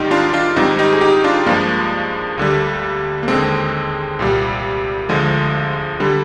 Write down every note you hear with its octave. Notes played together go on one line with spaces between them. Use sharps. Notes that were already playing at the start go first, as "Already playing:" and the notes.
Already playing: G#2 D#3 G3 D#4 G4
D4 F4
D4 F4
G#2 D#3 G3 C4 D#4
D#4 G4
G#4
D#4 G4
D4 F4
G2 F3 G#3 A#3 D4
D2 D3 G3
A#3
D#2 D3 G#3 C4
C2 A#2 G3
D2 D3 F3 G#3
D3 G3